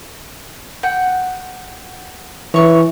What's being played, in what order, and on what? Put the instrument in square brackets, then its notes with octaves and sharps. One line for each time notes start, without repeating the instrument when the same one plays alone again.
[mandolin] F#5 G5
[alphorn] E3 [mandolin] C#5 C#6